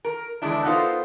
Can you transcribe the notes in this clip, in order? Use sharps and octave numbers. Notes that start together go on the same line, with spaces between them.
A#4
E2 D3 G#3 D4 E4
B3 D#4 F4 A4 A#4 C5